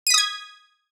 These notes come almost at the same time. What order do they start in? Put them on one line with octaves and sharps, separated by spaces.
D#7 B6 D#6 G#6